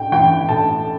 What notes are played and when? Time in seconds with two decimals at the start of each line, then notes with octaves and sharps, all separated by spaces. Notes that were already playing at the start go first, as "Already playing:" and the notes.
Already playing: A2 G5
0.12 E3 G5
0.49 A2 A5